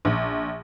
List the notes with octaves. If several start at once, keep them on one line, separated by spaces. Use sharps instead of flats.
A#1